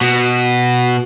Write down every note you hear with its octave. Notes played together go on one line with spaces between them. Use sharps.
B2